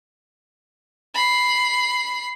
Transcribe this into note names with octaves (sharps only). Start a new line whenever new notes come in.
B5 C7